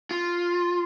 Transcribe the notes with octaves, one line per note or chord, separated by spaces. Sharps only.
F4